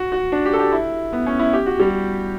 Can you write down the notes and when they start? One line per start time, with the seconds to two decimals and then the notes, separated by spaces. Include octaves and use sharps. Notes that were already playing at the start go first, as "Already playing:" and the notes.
Already playing: F#4
0.12 F#4
0.32 D4
0.45 G4
0.53 A4
0.59 G4
0.72 E4
1.13 B3
1.26 C#4
1.39 E4
1.53 G4
1.66 F#4
1.80 G3